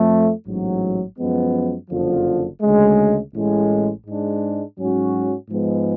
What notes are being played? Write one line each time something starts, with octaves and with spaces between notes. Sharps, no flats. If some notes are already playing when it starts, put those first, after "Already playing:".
Already playing: F2 F3 A3
A1 G#2 F#3
F#2 F3 G#3 B3
F#1 F2 D3 F3
D2 C#3 G#3
A1 A2 G#3
G#2 G#3 D4
G#2 F#3 C#4 F#4
G#2 F3 G#3 B3